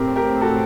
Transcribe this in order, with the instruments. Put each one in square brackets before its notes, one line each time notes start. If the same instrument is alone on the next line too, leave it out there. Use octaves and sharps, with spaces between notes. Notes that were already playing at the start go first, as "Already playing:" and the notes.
Already playing: [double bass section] A2 A3 C4 [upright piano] G4 A#4
[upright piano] G4 A#4
F#4 A4